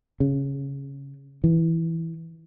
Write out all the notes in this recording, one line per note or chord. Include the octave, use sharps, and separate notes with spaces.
C#3
E3